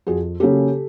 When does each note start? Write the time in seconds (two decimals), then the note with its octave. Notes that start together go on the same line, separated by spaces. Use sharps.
0.07 F2 F#4 G#4
0.40 C#3 F#3 A#3 C#4 G4 A4